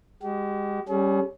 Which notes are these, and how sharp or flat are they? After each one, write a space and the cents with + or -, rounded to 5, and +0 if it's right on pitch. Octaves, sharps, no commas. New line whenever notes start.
G#3 -35 G4 -45
G3 +0 C#4 +0 G#4 +45